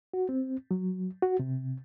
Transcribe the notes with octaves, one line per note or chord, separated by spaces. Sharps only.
F#4
C4
F#3
F#4
C3